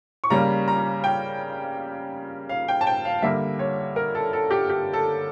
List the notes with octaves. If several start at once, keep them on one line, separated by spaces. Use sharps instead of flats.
C#6
C#3 G3 A#3 A#5
A#5
G5
F5
G5
A5
G5
F5
D3 G3 A#3 E5
C#5
A#4
A4
A4
G4
G4
A4